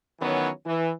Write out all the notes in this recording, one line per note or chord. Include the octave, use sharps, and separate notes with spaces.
D#3 E3 F#3 B3 C#4
E3